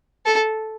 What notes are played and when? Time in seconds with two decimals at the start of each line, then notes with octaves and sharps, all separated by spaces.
0.26 A4